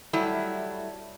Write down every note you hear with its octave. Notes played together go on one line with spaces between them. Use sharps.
F#3 G3 A3 E4